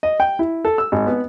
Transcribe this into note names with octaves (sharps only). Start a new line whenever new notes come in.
D#5
G5
E4
A4
E6
G#1
B3